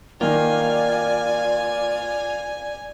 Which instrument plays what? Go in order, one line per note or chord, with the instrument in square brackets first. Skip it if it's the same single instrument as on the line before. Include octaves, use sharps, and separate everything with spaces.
[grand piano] D#3 A#3 [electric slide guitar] F4 [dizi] D5 [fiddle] G#5